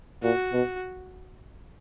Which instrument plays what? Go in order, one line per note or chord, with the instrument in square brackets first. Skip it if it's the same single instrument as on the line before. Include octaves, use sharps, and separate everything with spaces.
[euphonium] A#2 [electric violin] F#4
[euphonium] B2